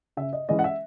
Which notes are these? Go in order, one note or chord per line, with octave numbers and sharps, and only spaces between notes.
C#3 E5
D#5
E3 G#3 C#4 D#5
F#5
E5